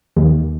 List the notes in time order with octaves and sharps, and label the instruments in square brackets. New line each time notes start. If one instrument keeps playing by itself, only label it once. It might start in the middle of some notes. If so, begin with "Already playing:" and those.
[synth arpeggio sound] D#2